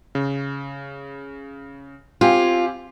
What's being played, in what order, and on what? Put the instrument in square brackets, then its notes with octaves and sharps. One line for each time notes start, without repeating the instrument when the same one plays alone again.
[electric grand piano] C#3
[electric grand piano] C4 G4 G#5 [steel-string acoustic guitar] F4